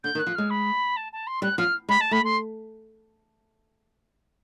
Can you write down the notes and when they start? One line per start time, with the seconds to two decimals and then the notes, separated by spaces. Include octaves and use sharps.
0.04 D3 G6
0.15 D#3
0.19 F#6
0.27 F3
0.35 G#3 F6
0.50 B5
0.96 A5
1.12 A5
1.27 C6
1.42 G3 F#6
1.58 F3 F6
1.89 G#3 B5
2.00 A5
2.11 A3 B5
2.24 C6